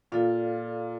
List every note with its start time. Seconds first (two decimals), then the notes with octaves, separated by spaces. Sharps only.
0.12 A#2 F4 A4 D5 F5